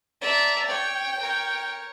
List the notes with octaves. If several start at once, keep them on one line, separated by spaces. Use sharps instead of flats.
D5 E5 A5 A#5
C#5 G5
A#4 C#5